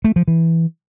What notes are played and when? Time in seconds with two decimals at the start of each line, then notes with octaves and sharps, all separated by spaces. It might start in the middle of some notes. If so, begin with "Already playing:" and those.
0.04 A3
0.16 F3
0.28 E3